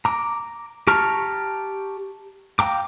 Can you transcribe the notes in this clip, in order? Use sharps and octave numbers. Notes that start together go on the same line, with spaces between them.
A#5 D6
G4 A5 A#5 C#6 F6
F5 G5 A#5 D6